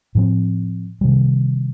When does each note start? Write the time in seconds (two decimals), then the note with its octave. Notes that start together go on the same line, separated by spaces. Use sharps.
0.15 A2 F3 C4
1.01 C3 D#3 G3